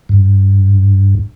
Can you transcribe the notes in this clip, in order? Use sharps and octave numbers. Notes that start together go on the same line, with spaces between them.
G2